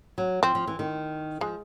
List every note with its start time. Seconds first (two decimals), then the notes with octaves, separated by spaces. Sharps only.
0.18 F#3
0.43 F3 C4
0.55 F3
0.67 E3
0.79 D#3
1.41 F3 G#3